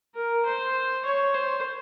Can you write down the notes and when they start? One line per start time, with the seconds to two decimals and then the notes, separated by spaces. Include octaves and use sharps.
0.15 A#4
0.45 C5
1.05 C#5
1.34 C5